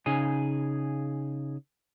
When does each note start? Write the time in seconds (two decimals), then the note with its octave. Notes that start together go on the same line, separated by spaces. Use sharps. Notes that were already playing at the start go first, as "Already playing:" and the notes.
0.06 C#3 D#4 G#4 G#5